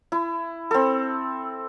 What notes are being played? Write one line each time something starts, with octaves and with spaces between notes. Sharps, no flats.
E4
C4 A4